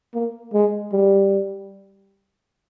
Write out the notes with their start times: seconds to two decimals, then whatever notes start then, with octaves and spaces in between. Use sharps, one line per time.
0.14 A#3
0.54 G#3
0.92 G3